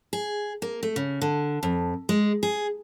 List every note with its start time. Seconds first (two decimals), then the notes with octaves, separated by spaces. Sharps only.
0.13 G#4
0.62 A#3
0.83 A3
0.96 C#3
1.22 D3
1.63 F2
2.09 G#3
2.43 G#4